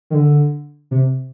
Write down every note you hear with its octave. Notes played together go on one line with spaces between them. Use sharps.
D#3
D3
C3